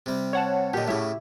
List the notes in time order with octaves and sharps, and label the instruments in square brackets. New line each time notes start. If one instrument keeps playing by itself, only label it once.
[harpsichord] C3 G3
[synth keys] C#5 F#5 A5
[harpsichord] A#2 D3 [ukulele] G4 D#5
[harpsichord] A2 C#3 [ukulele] E4 G4 E5